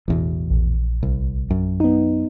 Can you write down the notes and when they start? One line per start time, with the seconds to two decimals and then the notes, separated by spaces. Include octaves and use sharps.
0.08 A1 E2 B2 E3
0.50 A#1
1.03 C2
1.51 F#2
1.80 B3 D#4